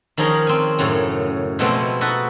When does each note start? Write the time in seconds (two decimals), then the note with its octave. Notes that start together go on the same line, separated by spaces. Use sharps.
0.17 D#3 F3 C#4 D#4 G#4 A#4
0.47 C4 G#5
0.79 F#2 A2 C#3
1.59 B2 F3 G#3 A3 B3 C4
2.01 D#4 F#4 A4 B4